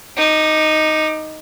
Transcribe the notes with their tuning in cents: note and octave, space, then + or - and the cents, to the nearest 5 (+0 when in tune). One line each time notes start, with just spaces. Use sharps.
D#4 +0 D6 +25